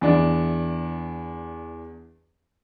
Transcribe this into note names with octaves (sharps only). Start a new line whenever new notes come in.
E2 D4 D5